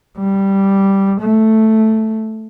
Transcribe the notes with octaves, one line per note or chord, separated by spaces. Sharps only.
G3
A3